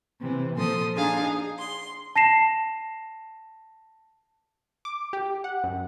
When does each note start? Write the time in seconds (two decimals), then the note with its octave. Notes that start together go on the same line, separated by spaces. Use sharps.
0.20 C3 E3
0.55 A#2 F3 A4 C6 D#6
0.94 D4 D#4 G#4 F5 G#5
1.23 G#4
1.59 C6
2.16 A5 A#6 C7 E7
4.85 D6
5.13 G4
5.44 F#5
5.64 F#2